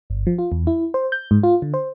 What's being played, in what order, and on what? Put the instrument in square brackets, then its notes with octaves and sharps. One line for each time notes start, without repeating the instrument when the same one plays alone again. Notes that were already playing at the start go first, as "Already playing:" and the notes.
[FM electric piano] G1
F3
F4
E2
E4
C5
G6
G#2
F4
D3
C5